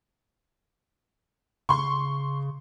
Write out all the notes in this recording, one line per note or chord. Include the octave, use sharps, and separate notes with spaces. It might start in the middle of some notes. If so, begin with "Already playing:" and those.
C#3 C6 C#6